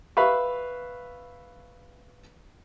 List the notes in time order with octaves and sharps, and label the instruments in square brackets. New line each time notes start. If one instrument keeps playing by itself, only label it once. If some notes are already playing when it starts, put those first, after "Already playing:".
[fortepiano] B4 E5 F5 B5 C#6